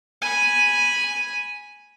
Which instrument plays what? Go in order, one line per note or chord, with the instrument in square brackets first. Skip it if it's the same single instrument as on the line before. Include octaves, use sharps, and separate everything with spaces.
[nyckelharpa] G#5 B5